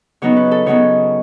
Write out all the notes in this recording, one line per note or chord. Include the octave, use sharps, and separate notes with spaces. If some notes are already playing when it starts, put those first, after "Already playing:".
C#3 F#3 B3 D#4 C#5
B4
A4
C#3 F#3 B3 D#4 C#5